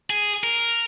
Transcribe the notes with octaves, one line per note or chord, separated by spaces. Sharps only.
G#4
A#4